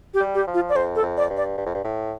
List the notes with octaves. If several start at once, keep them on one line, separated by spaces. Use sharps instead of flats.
G4
G3
G4
F3
F4
D5
F2 C5
A4
F2
D5
G2
D5
G2
F2
G2
A2